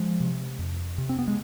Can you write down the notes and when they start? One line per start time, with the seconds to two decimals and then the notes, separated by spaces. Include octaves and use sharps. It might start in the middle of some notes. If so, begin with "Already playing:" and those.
Already playing: F3 G#3
0.20 C3
0.59 F2
0.98 C3
1.09 C4
1.19 B3
1.28 G#3